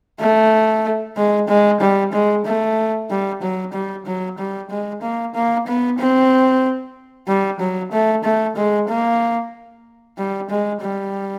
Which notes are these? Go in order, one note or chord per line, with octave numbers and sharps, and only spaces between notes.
A3
G#3
G#3
G3
G#3
A3
G3
F#3
G3
F#3
G3
G#3
A#3
A#3
B3
C4
G3
F#3
A3
A3
G#3
A#3
G3
G#3
G3